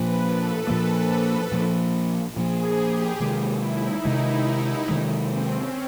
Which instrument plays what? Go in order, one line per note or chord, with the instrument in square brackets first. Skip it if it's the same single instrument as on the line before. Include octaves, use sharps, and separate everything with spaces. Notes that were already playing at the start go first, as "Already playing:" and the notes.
Already playing: [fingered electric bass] A#2 F3 A#3 [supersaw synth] B4
[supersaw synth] A4
[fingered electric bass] A#2 F3 A#3
A#2 F3 A#3
[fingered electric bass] A#2 F3 A#3 [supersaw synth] G#4
[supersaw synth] G4
[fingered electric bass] C3 D#3 G#3 [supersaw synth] F4
[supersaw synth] E4
D#4
[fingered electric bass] C3 D#3 G#3
[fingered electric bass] C3 D#3 G#3 [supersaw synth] D4
[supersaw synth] C4
C#4